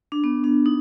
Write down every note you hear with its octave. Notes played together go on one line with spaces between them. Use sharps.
D4
B3
D4
D#4